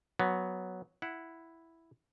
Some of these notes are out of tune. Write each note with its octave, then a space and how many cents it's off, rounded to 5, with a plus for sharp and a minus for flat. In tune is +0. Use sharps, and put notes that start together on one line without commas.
F#3 +0 B3 +0
E4 +0 F#5 +0